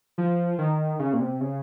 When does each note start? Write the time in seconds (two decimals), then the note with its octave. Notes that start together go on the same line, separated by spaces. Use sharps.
0.18 F3
0.58 D#3
0.99 C#3
1.13 A#2
1.20 C3
1.41 C#3